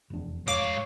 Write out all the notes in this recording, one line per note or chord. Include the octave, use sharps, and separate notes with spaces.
F1 E2 D4
G#2 C#5 F5 D6